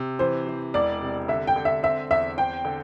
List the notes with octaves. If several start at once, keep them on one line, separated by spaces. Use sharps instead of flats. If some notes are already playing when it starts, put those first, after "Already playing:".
Already playing: C3
E3 C5
E3
E1 D5
C3
D3 E5
G5
D3
E5
C4 E5
E2 E5
C5 G5
D3